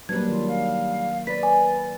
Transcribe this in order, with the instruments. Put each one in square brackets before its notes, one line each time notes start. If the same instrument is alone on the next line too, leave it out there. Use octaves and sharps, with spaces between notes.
[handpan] F#3 A#3 [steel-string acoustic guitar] G3 D4 [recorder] B4 [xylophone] G#6
[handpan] D#3 [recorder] F4
[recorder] F5
[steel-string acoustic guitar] B4 [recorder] D5 [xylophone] B6
[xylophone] G#5